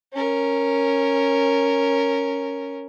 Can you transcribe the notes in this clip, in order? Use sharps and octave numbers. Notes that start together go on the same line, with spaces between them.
C#4 A#4